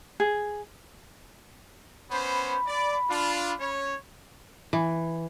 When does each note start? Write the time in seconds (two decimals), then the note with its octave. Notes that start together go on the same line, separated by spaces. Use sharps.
0.20 G#4
2.11 B3 C#4 C5 B5
2.66 D5
3.10 D4 F4
3.60 C#4 C#5
4.73 E3